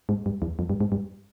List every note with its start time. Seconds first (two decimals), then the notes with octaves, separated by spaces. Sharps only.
0.09 G#2
0.26 G2
0.42 E2
0.59 F2
0.70 G2
0.81 G#2
0.92 G2